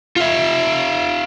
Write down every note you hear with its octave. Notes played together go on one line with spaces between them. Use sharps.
F4 E5